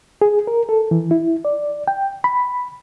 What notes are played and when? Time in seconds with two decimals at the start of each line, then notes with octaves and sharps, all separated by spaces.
0.22 G#4
0.47 A#4
0.69 A4
0.91 E3
1.11 E4
1.45 D5
1.88 G5
2.24 B5